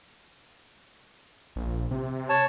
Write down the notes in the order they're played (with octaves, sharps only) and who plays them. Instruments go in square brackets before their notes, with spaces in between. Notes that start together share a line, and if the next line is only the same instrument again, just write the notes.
[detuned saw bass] A#1
C3
[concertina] C#5 A5